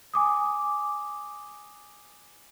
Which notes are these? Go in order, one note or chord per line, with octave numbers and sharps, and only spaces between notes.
G#5 D6 D#6